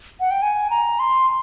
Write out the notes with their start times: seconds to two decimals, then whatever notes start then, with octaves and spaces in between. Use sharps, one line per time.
0.20 F#5
0.31 G5
0.42 G#5
0.70 A#5
0.99 C6